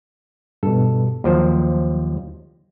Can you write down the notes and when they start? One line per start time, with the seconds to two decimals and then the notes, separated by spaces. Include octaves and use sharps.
0.63 G2 B2 A4
1.24 D#2 F3 F#3 C5